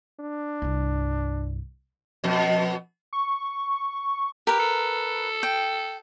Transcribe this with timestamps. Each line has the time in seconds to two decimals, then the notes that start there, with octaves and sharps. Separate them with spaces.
0.20 D4
0.62 C2 G2
2.24 F2 B2
3.13 C#6
4.47 G4 A#4 B4
4.60 A4
5.43 G5